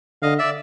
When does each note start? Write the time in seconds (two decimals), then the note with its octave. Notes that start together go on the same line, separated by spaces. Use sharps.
0.22 D3 D#5 F5
0.38 D5 E5